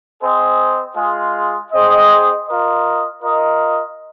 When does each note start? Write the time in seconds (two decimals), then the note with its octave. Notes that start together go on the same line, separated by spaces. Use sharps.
0.21 C4 G#4 C5 D#5
0.96 G#3 F4 G#4
1.71 C4 G#4 C5 D#5
2.47 F4 A#4 D#5
3.22 F4 A#4 D#5